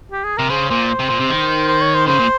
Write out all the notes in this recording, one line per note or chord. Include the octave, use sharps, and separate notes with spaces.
G4
G#4
C3 A#4
C#3 C5
A#2 C5
C3
A#2
C3
D#3
C5
C#5
C5
C#3 C5
A#2